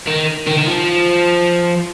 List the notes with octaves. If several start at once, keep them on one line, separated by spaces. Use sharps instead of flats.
D#3
D#3
D#3
F3